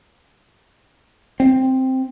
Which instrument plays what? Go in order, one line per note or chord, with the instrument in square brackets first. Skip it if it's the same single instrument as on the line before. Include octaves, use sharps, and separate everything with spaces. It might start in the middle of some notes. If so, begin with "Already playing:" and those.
[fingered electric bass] C4